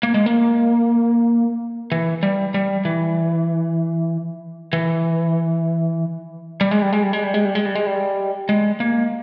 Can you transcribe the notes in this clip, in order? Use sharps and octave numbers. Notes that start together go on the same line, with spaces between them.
A#3
G#3
A#3
E3
G3
G3
E3
E3
G3
G#3
G3
G#3
G3
G#3
G3
G#3
G3
G#3
G3
G#3
G3
G#3
A#3